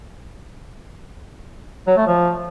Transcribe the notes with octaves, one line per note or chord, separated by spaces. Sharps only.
F#3
A3
F3